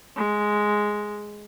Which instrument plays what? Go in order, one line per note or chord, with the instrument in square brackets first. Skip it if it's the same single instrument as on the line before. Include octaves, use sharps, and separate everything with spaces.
[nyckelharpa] G#3